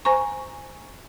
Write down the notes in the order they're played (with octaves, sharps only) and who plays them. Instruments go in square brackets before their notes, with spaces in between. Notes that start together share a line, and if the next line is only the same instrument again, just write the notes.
[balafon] C5 G#5 A#5 C#6